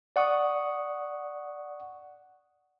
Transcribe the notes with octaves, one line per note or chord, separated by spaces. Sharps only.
D5 F#5 C#6 D#6